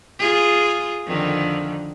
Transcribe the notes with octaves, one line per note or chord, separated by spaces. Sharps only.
F4 G#4
F2 D3 D#3